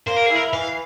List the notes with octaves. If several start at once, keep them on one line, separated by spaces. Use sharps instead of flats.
A#3 C5
A#4
E4 G#4
A#4
E3 F5